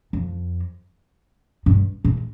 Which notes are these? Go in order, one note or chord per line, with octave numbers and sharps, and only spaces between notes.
F2
G2
A2